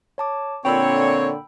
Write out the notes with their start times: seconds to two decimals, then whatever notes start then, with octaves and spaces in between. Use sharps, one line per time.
0.18 C#5 A5 D6
0.65 A#2 D3 C4 C#5 G5 B5 E6